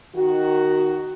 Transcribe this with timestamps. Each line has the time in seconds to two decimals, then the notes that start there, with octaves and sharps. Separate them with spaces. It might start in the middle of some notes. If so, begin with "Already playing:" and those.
0.15 D#3 F#4